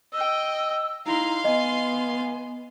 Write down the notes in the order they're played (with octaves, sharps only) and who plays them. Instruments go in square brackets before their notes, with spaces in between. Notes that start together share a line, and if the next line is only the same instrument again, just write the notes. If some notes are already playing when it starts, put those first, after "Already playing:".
[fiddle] D#5 G5 [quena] E6
[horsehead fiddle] D#4 E4 [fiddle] F5 C6 [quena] A#5
[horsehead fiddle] B3 [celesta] D#5 [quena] G#5